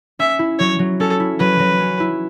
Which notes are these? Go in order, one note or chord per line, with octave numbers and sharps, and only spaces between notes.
C#4 E5
E4
F#3 C#5
F#3
C#4 A4
E4
F#3 B4
F#3
C#4
E4